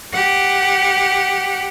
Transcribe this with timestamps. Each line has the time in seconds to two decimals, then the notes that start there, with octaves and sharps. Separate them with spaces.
0.13 G4 F#5